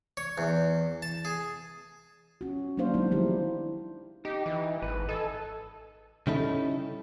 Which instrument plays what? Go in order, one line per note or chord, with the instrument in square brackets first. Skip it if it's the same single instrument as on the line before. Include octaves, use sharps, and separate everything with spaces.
[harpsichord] C#5
E2
A5
G#4
[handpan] C#4 F#4
F#3 G3 A#3 D4 C5 F5
F#3 G#3 B3 C4 D#4 E4
D#3 F3 D#4 E4 G4 C5
[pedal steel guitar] D#4 [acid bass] G4
[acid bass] E3
[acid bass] G#1 [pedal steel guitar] B4
[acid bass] A4 [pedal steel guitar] D#5 G#5 E6
[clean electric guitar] C#3 G3 C#4 D#4 E4 A4